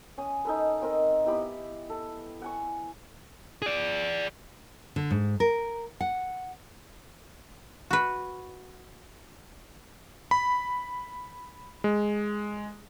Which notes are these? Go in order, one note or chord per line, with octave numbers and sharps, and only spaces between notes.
C#4 G#5 D#6
D#4 A4 B4
C4 A#4 D#5
B3 E4 G4 B5
A4
F#5 G#5 C#6
G#4 D5
D3
G#2
A#4
F#5
F#4 B4
B5
G#3